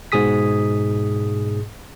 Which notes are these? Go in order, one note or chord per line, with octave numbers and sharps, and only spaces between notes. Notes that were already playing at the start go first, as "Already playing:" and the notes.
G#2 B2 G#4 D#6 B6